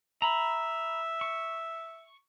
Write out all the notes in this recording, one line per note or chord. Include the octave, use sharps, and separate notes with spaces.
E5 A#5 B5
C#6